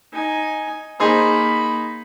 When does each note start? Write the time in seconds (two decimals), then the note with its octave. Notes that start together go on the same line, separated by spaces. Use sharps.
0.13 D#4 G#5
1.00 A#3 D#4 G#4 C5 B5